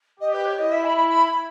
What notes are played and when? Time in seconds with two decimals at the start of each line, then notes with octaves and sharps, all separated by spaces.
0.20 G4 D#5
0.33 B4
0.45 C#5
0.58 E4 D#5
0.71 E5
0.84 B5
0.97 B5
1.09 B5